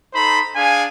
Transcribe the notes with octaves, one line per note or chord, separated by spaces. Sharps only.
D#4 A4 C5 A#5 B5
D4 G#4 F5 G#5